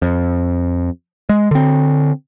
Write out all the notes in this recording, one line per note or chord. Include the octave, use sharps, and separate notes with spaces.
F2
G#3
D3 C4